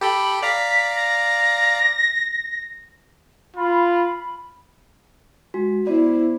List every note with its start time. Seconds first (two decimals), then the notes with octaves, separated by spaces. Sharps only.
0.01 G4 A4 G5 B5
0.42 D5 F5 A#5 B6
0.96 A#6
3.57 F4 B5
5.54 G#3 F#4
5.87 B3 E4 C5 D5